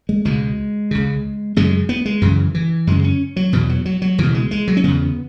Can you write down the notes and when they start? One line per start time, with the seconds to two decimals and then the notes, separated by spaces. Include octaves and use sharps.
0.09 G#3
0.25 C#2 B2 G#3
0.91 C#2 C#3
1.56 F#2 C#3 G#3
1.89 B3
2.05 G#3
2.22 F#2 C#3 E3
2.54 E3
2.87 F#2 C#3 G#3
3.04 C#4
3.36 F#3
3.53 E2 B2 E3
3.69 F#3
3.85 F#3
4.02 F#3
4.18 C#2 B2 E3
4.34 G#3
4.51 G#3
4.68 F#3
4.77 C#4
4.84 E2 C#3 B3